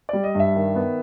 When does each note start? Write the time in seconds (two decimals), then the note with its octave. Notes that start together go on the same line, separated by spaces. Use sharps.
0.09 G3 D5
0.24 D#5
0.35 G2 E5
0.55 D#3
0.75 B3